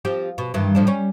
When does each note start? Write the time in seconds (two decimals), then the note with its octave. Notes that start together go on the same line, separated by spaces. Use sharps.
0.05 F3 C4 G4
0.38 B2
0.54 G2 D#3 E3
0.75 A2 F3 D4
0.87 G3 C#4